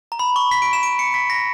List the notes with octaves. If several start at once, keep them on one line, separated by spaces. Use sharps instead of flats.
A#5
B5
C#6
B6
D7
E7
D7
C#7
B6
A#6